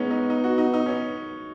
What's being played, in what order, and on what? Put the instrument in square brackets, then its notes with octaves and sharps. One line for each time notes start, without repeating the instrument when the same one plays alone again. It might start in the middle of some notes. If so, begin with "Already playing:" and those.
Already playing: [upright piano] G#3 C#4 D#4 [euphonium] B3
[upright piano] D#4
D#4
F#4
D#4
D#4
C#4